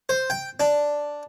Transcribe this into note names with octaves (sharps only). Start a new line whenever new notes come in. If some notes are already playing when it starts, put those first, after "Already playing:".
C5
G5
D4